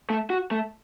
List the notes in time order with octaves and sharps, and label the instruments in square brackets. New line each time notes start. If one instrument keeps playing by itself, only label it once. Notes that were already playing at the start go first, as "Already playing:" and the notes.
[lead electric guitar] A3
F#4
A3